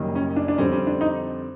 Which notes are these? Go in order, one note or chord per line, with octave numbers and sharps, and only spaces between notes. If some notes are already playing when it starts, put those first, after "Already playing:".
Already playing: F#1 F#2 D#3 G3 A#3
C#4
D4
D4
F2 D3 G3 C4 C#4
C#4
D4
D#4